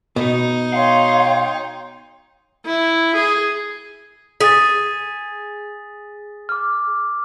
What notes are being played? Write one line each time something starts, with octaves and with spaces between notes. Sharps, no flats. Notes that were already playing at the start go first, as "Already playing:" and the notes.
B2 D#4
C#5 F5 G5 C6
E4
G#4
G#4 A6 B6
D6 F6